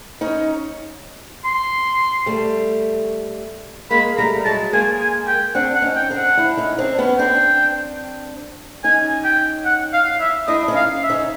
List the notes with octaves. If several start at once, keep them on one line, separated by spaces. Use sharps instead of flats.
C#4 D#4
C6
G3 A3
G#3 A#3 B5
G3 A3 A#5
F#3 G#3 A5
G#3 A#3 G#5
G#5
G5
C4 D4 F#5
F#5
C#4 D#4
G5
C4 D4
F#5
D4 E4
C#4 D#4
C4 D4
B3 C#4
C4 D4 G5
C#4 D#4 G#5
G5
F#5
F5
E5
D4 E4 D#5
C#4 D#4
F5
E5
C#4 D#4